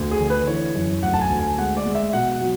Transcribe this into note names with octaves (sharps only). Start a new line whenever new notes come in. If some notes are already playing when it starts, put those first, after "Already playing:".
Already playing: D2
G#4
D3
B4
E3 C#5
F#2
D2 F#5
A5
G#5
D2
G#5
G#3 F#5
D5
G#3
E5
B2 F#5
F#5
F#3